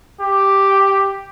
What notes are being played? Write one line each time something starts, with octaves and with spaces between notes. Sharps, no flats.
G4